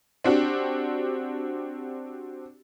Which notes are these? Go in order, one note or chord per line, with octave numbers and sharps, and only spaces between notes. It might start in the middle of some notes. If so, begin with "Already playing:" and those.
C4 D4 F#4 G4